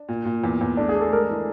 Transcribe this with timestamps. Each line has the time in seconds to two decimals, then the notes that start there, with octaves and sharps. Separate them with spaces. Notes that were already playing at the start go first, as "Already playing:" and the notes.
Already playing: D4
0.09 A#2
0.25 A#2
0.44 E2
0.61 E2
0.77 A3 D4
0.89 G#4
0.96 A3
1.01 A4
1.12 G#3 A#4
1.30 E3